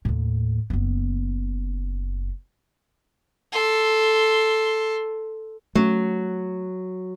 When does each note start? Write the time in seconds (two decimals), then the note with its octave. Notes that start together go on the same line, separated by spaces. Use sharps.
0.05 D#2 A2
0.70 F#1 B3
3.52 A4 C6
5.75 F#3 A3 C#4